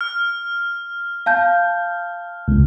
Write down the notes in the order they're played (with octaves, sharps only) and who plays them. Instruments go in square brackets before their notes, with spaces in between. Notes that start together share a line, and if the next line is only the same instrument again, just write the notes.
[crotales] F6
[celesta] F5 A5 G6
[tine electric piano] C#2